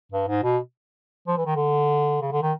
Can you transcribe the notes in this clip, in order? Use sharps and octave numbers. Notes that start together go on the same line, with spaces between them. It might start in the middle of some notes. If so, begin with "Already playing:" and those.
G2
G#2
B2
F3
E3
D#3
D3
C#3
D3
D#3